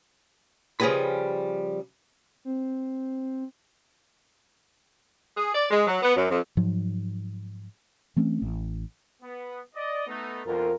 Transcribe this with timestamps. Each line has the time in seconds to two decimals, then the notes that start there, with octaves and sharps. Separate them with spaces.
0.80 C#3 F3 G3 G#4 B4 B5
2.45 C4
5.38 G#4
5.55 D5
5.71 G#3
5.87 F#3
6.03 B3
6.16 F#2
6.30 F2
6.57 G#2 F3 F#3
8.16 E3 A3 C4 C#4
8.42 A1
9.22 B3
9.75 D5 D#5
10.07 A3 B3 D#4
10.46 F2 B2 D3 F4 A#4